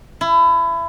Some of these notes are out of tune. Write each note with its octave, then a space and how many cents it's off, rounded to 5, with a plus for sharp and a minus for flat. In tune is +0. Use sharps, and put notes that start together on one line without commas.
E4 +25